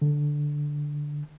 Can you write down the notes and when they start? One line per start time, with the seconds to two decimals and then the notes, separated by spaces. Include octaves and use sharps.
0.02 D3